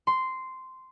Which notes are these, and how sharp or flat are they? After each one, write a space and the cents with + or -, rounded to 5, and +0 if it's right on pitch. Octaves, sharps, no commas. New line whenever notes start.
C6 -10